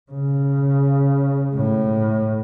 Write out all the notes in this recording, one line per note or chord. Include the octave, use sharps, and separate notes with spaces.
C#3
A2